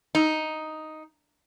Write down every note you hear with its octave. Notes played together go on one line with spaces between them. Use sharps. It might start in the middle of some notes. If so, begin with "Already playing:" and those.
D#4